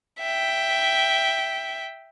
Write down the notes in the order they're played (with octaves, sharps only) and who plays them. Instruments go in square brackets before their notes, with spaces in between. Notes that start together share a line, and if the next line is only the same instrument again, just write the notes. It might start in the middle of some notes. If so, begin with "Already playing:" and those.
[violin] E5 G5